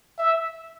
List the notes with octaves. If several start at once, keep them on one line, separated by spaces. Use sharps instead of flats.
E5